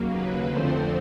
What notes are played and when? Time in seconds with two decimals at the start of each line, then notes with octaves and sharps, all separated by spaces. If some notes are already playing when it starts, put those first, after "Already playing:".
Already playing: D#2 C#3 F#3 A#3
0.10 B4
0.47 F2 D3 F3 A3 C4 C5